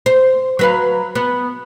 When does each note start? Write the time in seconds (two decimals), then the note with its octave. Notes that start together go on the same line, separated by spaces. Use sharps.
0.06 C5
0.59 F#3 B4 F5
1.15 B3